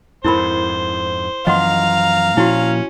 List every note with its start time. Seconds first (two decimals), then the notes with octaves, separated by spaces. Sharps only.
0.24 F2 G#2 E4 A#4 C5 B5
1.47 F#2 E3 F3 D#5 F5 F#5 A#5 C6
2.37 A#2 F3 C#4 E4 F#4